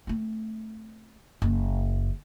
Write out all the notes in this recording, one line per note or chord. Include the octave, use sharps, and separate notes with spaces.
A3 C4
F#1 F#2